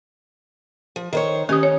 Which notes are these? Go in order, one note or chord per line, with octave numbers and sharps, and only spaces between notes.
F3
D#3 C5 C#5
D#3 C#4 G4 D#6
C#5